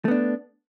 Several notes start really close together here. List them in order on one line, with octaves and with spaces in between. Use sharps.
A3 B3 D4